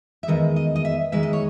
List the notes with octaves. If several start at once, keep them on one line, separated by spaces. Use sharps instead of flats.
E5
E2 D#3 G#3 D#5
D#5
D#5
E5
E2 D#3 G#3 E5
D#5
C#5